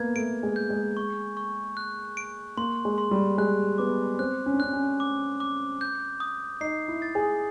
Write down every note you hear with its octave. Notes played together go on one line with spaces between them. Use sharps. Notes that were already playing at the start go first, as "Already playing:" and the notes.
Already playing: A#3 B3 G#6
A3 D7
G#3
G6
G#3
C#6
C#6
F#6
D7
A#3 C6
G#3
C6
G3
G#3 F#6
B3 D6
C4 F#6
C#4
D4
C#4 F#6
C#4
D6
D6
G6
D#6
D#4 C7
E4
A6
G#4